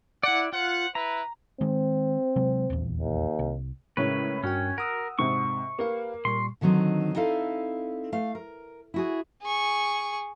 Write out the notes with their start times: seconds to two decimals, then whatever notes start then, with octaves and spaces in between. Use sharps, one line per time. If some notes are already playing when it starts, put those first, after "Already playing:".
0.23 E4 D5 F#5
0.52 F4 C5 F#5
0.95 E4 B4 A#5
1.61 D#3 G#3 C4
2.36 C3 F#3 G#3
2.70 D#1 A#1 E2
3.00 D#2
3.39 C2
3.97 A2 C#3 G#3 A#4 B4 C#5
4.44 G2 C#4 F#4 A#4 G5
4.78 A#4 F#5 D#6 E6
5.19 G#2 C3 C#6
5.79 A#3 G4 B4 F5
6.25 A#2 G3 C6 C#6
6.61 D3 D#3 F#3 C4 D#4
7.15 C4 D#4 E4 A4 F5
8.12 A3 F5
8.35 A#4
8.94 E4 F#4 G#4
9.42 G#4 C#6